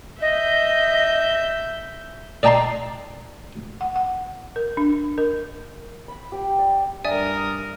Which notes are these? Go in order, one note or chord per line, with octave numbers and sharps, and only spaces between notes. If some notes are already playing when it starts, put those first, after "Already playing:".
D#5 E5 G6
D5 D#5 G5 A5 A#5 C6
F#5
F#5
A#4
D4
A#4
B5
G4 G5
D5
G2 A#4 D5 E5 G#5 D#6